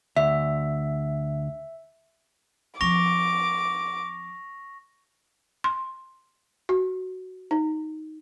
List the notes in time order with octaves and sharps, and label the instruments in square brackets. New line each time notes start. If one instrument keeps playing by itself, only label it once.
[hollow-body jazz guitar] D2 [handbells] E5
[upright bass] F3 C4 [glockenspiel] C#6 A#6 F7 [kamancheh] D6
[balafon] C6
F#4
D#4